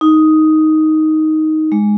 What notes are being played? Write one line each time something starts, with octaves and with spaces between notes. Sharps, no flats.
D#4
G#3